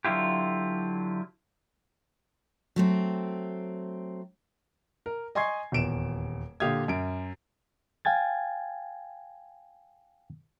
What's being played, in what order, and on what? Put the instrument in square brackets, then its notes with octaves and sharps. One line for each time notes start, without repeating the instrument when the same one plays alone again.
[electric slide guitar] D3 F#3 C4 E4 F4 G4
[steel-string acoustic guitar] F#3 A3 C4
[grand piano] A#4
D#5 G#5 C6 C#6 G#6 C7
D#1 E2 D7 E7
A#2 D3 G4 F5 D#6 G#6
F#2 D7
[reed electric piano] F5 G5 G#5 G#6 A6